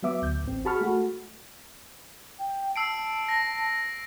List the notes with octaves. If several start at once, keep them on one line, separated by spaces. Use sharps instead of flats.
F#3 B3 E5 D6
D2 G6
A1 C4
F#4 G#4 A5 B5 C#6 F6
A3 F#4
G5
A5 E6 C7 D7
A#6